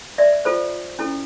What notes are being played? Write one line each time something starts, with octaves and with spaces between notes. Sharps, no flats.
D5 E5
F4 A4 C5
C#4 E4 A4